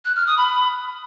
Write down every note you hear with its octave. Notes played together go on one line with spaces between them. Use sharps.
F#6
F6
D#6
B5